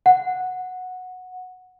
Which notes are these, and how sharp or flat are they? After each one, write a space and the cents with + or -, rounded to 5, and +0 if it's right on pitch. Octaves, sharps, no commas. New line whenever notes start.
F#5 -10